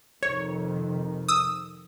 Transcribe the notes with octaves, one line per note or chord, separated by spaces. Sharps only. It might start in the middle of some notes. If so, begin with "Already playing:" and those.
F2 C3 D#3 C#5
D#6 E6